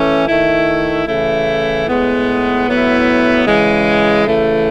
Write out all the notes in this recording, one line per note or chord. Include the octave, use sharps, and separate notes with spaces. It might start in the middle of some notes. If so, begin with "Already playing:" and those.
Already playing: E3 A3 C#4
D#3 A3 E4
C#3 E3 A3 E4
A2 G#3 B3
A2 F#3 B3 E4
C#3 E3 G#3
C#3 E3 A3